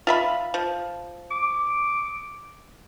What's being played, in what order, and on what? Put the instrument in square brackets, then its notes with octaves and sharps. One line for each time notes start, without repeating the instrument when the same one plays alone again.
[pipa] F4 E5 B5
F3
[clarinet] D6